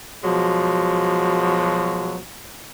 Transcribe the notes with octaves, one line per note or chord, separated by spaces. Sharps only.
B2 F3 F#3 G#3